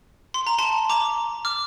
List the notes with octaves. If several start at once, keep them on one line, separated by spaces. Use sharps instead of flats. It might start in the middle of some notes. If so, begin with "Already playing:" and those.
C6
A#5
A5 C6
A#5 D6
D6 F6